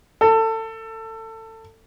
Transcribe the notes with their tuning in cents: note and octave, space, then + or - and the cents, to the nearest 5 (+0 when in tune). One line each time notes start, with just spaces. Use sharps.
A4 +25